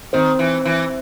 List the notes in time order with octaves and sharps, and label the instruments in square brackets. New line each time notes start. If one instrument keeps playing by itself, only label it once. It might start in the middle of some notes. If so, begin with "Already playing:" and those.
[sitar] D#3 [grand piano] C4
[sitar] E3
E3